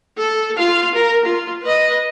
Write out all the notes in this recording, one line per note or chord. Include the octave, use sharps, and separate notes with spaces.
A4
F4 F5
A#4
F4
B4 D#5